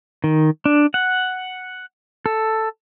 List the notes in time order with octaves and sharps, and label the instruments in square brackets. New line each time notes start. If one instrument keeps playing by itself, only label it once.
[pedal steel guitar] D#3
D4
F#5
A4